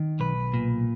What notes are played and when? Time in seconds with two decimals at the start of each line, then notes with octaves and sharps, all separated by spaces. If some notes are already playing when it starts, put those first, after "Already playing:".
Already playing: D#3
0.20 B1 B4
0.54 A#2